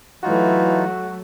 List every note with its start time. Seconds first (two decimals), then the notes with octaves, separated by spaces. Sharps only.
0.23 E3 F#3 A3 D#4 F4 F#4